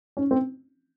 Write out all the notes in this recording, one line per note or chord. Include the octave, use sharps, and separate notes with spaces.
C#4
C4